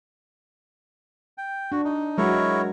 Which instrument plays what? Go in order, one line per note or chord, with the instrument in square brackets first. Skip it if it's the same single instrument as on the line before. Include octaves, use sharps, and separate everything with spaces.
[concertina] G5
[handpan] D4 [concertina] F#4
[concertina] D#4
[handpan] F#3 G#3 F#4 [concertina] E4 A#4 C#5